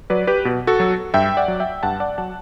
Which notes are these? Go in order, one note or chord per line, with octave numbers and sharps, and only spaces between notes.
F#3 B4 D5
G4 B4
B2
F#4 A4
F#3
G2 E5 G5
D5 F#5
F#3
E5 G5
G2 F#5 A5
D5 F#5
F#3 F#5 A5